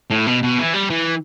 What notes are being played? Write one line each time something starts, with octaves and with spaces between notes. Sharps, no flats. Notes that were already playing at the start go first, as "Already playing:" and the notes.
A2
B2
B2
E3
G3
E3